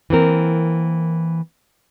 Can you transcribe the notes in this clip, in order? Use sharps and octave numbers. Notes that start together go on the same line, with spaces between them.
E3 A#3 C4 A#4